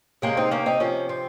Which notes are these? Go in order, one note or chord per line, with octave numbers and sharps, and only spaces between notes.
C3 F3 G#3 A#3 C#4
C4 D#4
A#3 C#4
C4 D#4
C3 F3 A#3 C#4
C4